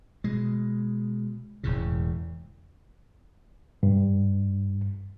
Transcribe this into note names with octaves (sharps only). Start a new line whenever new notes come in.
B2 G#3
E1 E2 A2 C#3
G2